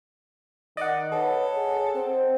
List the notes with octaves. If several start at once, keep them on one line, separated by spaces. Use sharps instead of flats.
D#3 D5 D#5 F#5
A4 B4 C#5
G#4
C4 C5